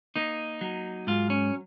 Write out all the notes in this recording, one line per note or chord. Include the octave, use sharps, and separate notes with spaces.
A#3 D#4
F#3
G#2 F4
C#4